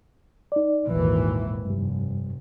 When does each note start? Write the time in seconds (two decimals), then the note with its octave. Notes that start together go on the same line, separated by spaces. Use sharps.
0.52 D#4 D5
0.87 G#1 D#2 A#2 E3
1.66 F1 G2 G3